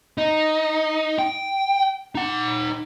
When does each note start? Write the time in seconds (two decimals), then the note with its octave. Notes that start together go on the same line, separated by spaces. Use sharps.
0.18 D#4
1.19 G5
2.15 D#4 F#5